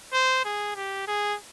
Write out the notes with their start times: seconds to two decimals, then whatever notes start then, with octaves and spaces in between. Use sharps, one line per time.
0.13 C5
0.45 G#4
0.76 G4
1.07 G#4